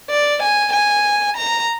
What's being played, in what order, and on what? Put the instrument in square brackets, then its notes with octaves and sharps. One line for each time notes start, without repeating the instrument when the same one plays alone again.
[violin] D5
G#5
G#5
A#5